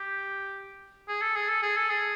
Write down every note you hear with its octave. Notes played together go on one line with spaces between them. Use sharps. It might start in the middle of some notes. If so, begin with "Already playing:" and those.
Already playing: G4
G#4
A4
G#4
A4
G#4
A4
G#4